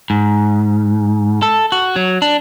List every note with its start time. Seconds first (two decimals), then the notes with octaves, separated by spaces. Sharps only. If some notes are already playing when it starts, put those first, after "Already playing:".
0.10 G#2
1.43 A4
1.72 F#4
1.96 F#3
2.22 D4